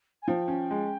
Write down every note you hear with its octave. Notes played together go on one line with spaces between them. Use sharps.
G#5
F3 G5
C#4
G#3